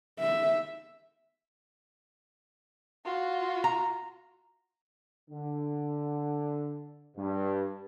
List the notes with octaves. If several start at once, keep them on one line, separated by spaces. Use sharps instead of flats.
E5
F4 F#4
A#5
D3
G2